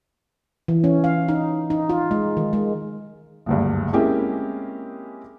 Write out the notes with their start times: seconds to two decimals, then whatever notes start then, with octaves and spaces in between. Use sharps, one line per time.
0.68 E3
0.84 C#4
1.04 F5
1.28 D#4
1.70 D#4
1.89 F4
2.11 G#3
2.37 D#3
2.53 G#3
3.46 F#1 D2 G2
3.93 G#3 A#3 C4 C#4 E4 G4